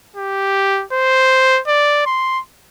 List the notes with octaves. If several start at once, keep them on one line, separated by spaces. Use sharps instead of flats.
G4
C5
D5
C6